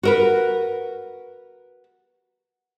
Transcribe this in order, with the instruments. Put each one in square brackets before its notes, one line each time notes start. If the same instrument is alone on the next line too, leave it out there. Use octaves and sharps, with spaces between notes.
[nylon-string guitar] F#4 A#4 B4